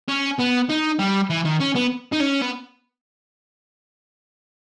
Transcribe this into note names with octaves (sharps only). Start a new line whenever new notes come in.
C#4
B3
D#4
G3
E3
D#3
C#4
B3
D#4
C#4
B3